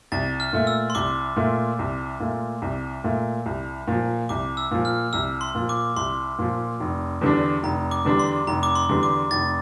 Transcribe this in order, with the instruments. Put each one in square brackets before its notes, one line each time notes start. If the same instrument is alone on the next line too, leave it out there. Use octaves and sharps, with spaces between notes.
[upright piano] C2 [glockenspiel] A6
[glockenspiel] F6
[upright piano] A#2 A3
[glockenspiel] E6
C6
[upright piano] C2 [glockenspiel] D6
[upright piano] A#2 A3
C2
A#2 A3
C2
A#2 A3
C2
A#2 F3
[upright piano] C2 [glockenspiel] D6
[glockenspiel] E6
[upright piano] A#2 F3
[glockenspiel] F6
[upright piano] C2 [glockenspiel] E6
[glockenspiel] C6
[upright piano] A#2 F3
[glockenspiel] D6
[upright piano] C2 [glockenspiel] C6
[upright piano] A#2 F3
F1
E2 D3 G3 D4
[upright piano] F1 [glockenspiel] A#5
[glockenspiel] D6
[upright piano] E2 D3 G3 D4
[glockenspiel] C6
[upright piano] F1 [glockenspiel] A#5
[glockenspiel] D6
C6
[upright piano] E2 D3 G3 D4
[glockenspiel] D6
[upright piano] F1 [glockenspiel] A6